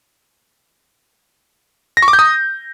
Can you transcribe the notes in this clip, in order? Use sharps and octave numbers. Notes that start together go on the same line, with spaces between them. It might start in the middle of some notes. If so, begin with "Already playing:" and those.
A#6
C#6
D6
G6
D#6